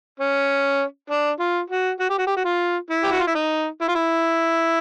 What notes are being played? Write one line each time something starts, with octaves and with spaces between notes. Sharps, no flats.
C#4
D4
F4
F#4
F#4
G4
F#4
G4
F#4
F4
E4
G4
F#4
F4
E4
D#4
E4
F4
E4